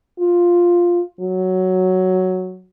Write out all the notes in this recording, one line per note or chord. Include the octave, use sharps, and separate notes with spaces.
F4
F#3